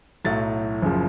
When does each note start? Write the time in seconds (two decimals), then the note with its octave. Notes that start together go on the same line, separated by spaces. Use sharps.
0.25 B1 A2 F#3 A6
0.82 F#1 C#3 F3